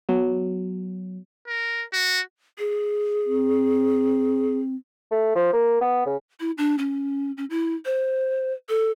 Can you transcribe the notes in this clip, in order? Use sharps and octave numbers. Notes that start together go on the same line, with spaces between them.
F#3 B3
A#4
F#4
G#4
C4
A3
F3
A#3
B3
C#3
E4
D4
C#4
C#4
E4
C5
A4